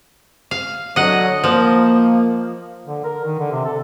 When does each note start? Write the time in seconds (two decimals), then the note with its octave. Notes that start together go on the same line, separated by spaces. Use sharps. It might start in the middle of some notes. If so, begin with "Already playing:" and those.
0.51 F5
0.96 D3 F#3 D#5 F#5
1.44 F3 A#3
2.87 D3
3.04 A#4
3.25 D#3
3.39 D3
3.52 C3
3.65 A4